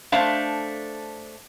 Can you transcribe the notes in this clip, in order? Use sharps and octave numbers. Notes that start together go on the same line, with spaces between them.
A3 D4 C5 F5 A5